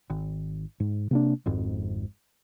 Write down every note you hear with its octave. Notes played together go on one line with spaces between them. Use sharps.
G#1
G#2
C3 A#3 D4
G#1 F2 G#2